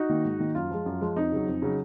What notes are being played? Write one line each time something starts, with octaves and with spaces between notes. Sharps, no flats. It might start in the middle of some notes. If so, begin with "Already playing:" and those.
Already playing: D#4 F#4
D#3 A#3
G#2
D#3 A#3
F#2 F4
F3 G#3
F#2
F3 G#3
F2 D#4
C#3 F#3
F2
C#3 F#3